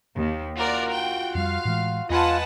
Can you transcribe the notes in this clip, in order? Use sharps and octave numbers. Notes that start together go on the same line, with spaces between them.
D#2
F4 F#4 A#4 D5
G5
F2 G3 F5
A2 E3 G#3
E2 F4 B4 D#5 F#5 G#5 A5